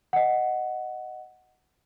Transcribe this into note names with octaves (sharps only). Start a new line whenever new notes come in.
D#5 F#5